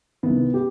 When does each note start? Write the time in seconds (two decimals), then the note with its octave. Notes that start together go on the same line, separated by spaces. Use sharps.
0.23 C2 C3 D#3 B3
0.54 G4